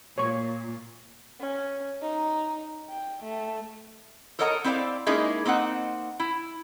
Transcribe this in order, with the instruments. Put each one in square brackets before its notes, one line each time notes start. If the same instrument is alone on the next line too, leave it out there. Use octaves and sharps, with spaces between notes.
[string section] A#2 [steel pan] C#5 C#6
[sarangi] C#4
D#4
G5
A3
[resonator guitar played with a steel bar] A4 A#4 C#5 D#5 F#5 A#5
C4 E4 C5 D5 F5
G#3 A#3 C#4 D#4 E4 G#4
A#3 C4 D#4 F#5
E4